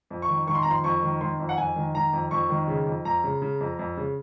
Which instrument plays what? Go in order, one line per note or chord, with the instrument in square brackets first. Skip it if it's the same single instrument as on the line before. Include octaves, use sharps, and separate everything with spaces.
[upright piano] F2
C#6
D#3
D#3 C#6
C6
A#5
F2 C6
F2 C#6
D#3
D#3 C6
F2
F#5
F2 G#5
D#3
D#3 A#5
F2
F2 C#6
D#3
C#3
F2
F2 A#5
C#3
C#3
F2
F2
C#3